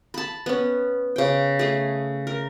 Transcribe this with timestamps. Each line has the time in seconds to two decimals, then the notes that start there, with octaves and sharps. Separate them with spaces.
0.14 A5 B5
0.46 B3 C#4
1.16 C#3 G5
1.59 A3 G#4
2.27 A#4